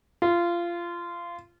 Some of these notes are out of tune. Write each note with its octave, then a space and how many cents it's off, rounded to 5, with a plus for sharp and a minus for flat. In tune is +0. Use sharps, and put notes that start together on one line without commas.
F4 -20